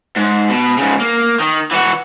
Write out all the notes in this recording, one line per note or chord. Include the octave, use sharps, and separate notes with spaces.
G#2
B2
G#2 C#3
A#3
D#3
E3 F#4